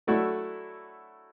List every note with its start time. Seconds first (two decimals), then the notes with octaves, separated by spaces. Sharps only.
0.07 F#3 A3 D4 E4 F#4